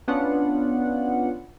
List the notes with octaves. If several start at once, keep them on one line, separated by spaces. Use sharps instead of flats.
B3 C#4 D4 F4 F#5